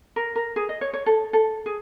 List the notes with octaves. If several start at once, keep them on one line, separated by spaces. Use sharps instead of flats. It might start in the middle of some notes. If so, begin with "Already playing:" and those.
A#4
A#4
G#4
D#5
C#5
C#5
A4
A4
G#4